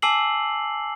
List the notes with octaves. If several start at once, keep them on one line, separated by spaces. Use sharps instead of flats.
G#5 A5 D6 E6 C7 F#7